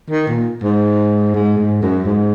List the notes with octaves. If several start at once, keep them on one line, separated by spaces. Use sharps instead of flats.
D#3
A#2
G#2
G#2
G#2
F#2
G#2